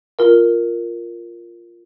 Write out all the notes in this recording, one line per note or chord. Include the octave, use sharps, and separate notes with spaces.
F4 A#4